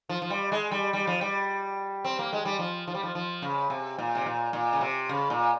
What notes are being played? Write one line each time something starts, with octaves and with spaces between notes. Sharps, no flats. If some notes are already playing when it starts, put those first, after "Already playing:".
F3
F3
G3
G#3
G3
G3
F3
G3
C4
A#3
G#3
G3
F3
F3
G3
F3
F3
C#3
C3
A#2
C3
A#2
A#2
C#3
C3
C#3
A#2